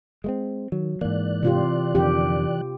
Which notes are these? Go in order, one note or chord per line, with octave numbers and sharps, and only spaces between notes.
G#3 A3 C4
D#3 F#3
G#2 E3 A#3 D5 F#6
C3 F4 G4
F2 D3 D#3 G4